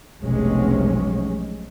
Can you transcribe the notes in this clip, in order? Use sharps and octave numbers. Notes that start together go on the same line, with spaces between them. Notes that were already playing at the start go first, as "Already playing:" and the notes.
F1 B1 C3 G#3 C#4